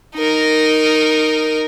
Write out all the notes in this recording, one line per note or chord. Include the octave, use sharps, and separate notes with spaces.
D#4 A#4